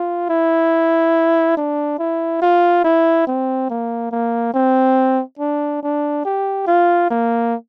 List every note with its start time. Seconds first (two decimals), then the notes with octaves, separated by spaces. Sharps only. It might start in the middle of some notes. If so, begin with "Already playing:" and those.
Already playing: F4
0.30 E4
1.57 D4
1.99 E4
2.42 F4
2.85 E4
3.27 C4
3.70 A#3
4.12 A#3
4.54 C4
5.39 D4
5.83 D4
6.25 G4
6.67 F4
7.10 A#3